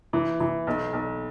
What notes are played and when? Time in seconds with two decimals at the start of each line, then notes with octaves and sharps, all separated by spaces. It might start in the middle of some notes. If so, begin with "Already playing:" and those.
0.13 E3
0.40 E3
0.67 B1
0.93 B1